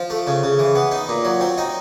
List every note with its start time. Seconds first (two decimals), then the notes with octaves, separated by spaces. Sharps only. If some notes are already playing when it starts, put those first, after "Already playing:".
Already playing: F3
0.10 A3
0.27 C#3
0.43 C#3
0.59 E3
0.75 B3
0.91 D#4
1.09 A#2
1.25 F#3
1.41 C4
1.58 D#4